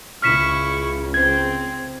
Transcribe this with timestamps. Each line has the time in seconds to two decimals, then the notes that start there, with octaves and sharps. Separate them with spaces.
0.22 C#2 C#3 E4 C#6 F6 B6 E7
1.14 C4 G#6